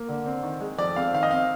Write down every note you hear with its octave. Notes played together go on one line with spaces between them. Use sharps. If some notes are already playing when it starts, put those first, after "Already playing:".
Already playing: A#3
D3
C4
D#3
G#3
F2 D5
C4 F5
D#3 F5
D#5
C4 F5